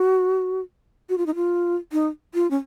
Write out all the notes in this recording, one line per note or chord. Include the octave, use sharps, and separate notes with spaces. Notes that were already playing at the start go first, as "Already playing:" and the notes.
Already playing: F#4
F#4
F4
D#4
F4
D#4
F4
C#4